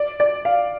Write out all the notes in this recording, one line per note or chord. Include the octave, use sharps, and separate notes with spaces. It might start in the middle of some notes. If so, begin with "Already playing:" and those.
Already playing: D5
D5
F5